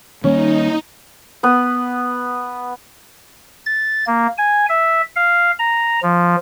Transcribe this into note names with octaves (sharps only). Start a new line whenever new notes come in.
D#3 G3 A#3 C#4 D#4
B3 B4
A6
A#3
G#5
E5
F5
A#5
F3